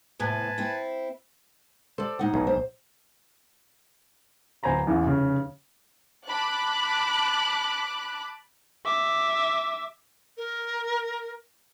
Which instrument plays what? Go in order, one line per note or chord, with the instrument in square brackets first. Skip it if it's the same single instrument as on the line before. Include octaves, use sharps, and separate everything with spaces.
[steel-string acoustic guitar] E2 A2 C3 [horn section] B4 G#5 A5
[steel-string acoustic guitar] C4 E4
[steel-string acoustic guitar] A4 D5 [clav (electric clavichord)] C5
[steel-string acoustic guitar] A2 D#4 F#5
[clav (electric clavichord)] B1
[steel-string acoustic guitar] C5
[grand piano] D1 C5 G#5 A#5 B5
A1 E2
F1 C#3
[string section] A5 B5 D6 F#6
[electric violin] E5 D6
[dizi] A#4